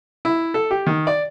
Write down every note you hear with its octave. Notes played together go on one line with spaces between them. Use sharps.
E4
A4
G4
D#3
D5